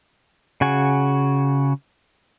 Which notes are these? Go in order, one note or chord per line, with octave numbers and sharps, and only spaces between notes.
C#3 F#4 G#5